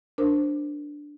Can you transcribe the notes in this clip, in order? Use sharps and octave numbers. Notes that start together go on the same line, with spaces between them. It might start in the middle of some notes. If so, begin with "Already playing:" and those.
D4 A#4 C5